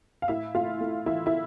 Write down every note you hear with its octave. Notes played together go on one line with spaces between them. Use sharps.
F5
A2 E4 E5
A3 F4 F5
A3
E3 E4 E5
E4 E5